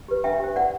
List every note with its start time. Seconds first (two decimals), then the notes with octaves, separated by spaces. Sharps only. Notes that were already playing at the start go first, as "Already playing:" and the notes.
0.08 G4 B4
0.24 D4 E5 G5
0.40 G4 C5
0.55 E4 D5 F#5